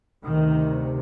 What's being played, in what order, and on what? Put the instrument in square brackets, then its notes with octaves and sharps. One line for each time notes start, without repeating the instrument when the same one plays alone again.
[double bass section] D2 C3 D#3